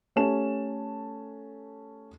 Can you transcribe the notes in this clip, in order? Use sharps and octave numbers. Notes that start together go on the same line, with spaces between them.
A3 C#4 G4 A5 E7